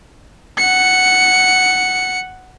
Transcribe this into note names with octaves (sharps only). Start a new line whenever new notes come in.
F#5 C#7